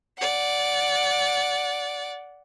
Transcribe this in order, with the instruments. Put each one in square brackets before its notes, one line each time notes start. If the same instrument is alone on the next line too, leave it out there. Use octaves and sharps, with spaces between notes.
[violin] D5 F#5